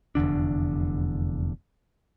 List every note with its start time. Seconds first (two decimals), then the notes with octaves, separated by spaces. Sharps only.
0.15 F1 E2 D3 D4